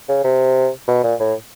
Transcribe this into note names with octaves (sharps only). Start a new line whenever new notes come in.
C#3
C3
B2
A#2
A2